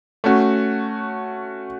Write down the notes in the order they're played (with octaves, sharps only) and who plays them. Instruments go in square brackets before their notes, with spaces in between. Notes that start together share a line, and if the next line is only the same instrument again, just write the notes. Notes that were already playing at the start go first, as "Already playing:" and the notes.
[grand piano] A3 C#4 F#4